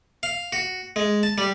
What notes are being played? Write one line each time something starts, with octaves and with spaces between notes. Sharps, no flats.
F5
F#4
G#3
A5
G3